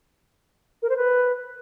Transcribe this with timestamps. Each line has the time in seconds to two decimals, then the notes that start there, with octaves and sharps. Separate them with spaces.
0.82 A#4
0.89 C5
0.96 B4